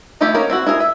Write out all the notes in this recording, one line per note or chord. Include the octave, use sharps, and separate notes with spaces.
D#3 F3 A3 E4 G4
A#3 C#4 D#4 A#4
C4 E4 F#4
E4 G#4 A#4 G#5
E5